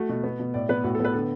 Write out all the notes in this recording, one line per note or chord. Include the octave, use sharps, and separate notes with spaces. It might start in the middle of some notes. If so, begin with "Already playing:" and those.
Already playing: A3 F#4
B2
B3
B2
A2 D5
B3 B4
A2 F#4
A4
B3
B4
D3 A4